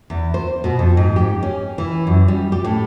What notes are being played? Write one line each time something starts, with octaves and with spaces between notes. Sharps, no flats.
E2
C5
B2
F2
G#2
G4
C#4
E3
F#2
G3
G4
A2